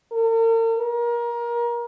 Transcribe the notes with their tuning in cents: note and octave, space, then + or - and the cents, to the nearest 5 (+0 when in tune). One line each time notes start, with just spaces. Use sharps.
A#4 -45
A#4 +25